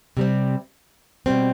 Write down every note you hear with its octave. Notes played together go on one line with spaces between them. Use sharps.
C3 G3 C4
B2 G3 C4